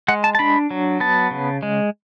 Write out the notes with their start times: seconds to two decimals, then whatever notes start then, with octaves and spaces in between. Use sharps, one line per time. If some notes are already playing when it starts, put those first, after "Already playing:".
0.08 G#3 F#5
0.24 A5
0.35 A5
0.39 D4 B5
0.71 F#3
1.00 B3 A5
1.31 C#3
1.63 G#3